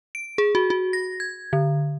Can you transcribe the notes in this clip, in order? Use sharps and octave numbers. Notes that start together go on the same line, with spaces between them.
D7
G#4
F#4
F#4
A#6
G#6
D3